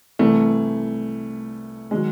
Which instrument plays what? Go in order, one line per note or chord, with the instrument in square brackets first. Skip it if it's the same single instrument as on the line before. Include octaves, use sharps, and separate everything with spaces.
[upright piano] C2 C3 E3 A3
D#3 F#3 G#3